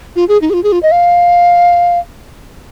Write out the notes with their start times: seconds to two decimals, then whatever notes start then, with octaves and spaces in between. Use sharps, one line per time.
0.16 F4
0.29 G#4
0.42 D#4
0.50 G#4
0.54 F4
0.64 G#4
0.72 F4
0.83 D#5
0.92 F5